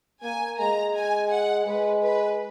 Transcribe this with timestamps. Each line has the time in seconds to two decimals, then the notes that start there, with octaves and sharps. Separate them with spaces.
0.23 A#3 G#5
0.59 G#3 A#5
0.95 G#5
1.31 F#5
1.66 G#3 B4
2.02 B4